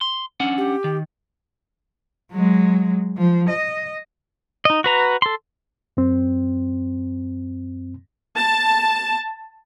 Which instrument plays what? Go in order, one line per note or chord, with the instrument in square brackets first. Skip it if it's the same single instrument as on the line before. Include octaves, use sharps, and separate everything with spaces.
[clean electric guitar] C6
C#4 D4 F#5
[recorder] G4
[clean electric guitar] D#3
[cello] F#3 G#3
F3
D#5
[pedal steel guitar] D#4 D#5
F#4 B4 A#5
A4 C6
[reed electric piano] F#2 C4
[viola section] A5